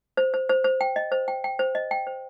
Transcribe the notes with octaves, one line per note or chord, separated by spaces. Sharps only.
C5
C5
C5
C5
G5
D#5
C5
G5
G5
C5
D#5
G5
C5